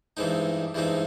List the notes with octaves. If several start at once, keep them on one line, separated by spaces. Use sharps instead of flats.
G2 E3 G#3 C4 D#4
G2 E3 G#3 C4 D#4